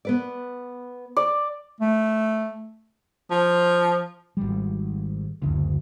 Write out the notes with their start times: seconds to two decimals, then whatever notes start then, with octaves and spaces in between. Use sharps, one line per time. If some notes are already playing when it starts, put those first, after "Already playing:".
0.05 B3 B4 D5
1.17 D5
1.80 A3
3.31 F3
4.37 G#1 G3
5.42 F#1 D2